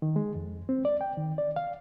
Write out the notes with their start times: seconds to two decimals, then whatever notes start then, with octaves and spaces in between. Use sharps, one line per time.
0.02 D#3
0.16 G#3
0.35 F2
0.69 C4
0.85 D5
1.01 G5
1.17 D#3
1.38 D5
1.56 F5